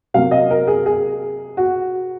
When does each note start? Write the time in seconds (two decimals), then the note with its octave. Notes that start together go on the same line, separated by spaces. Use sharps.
0.14 C3 F#3 A#3 F5
0.31 D#5
0.50 A#4
0.67 G#4
0.86 G#4
1.57 F#4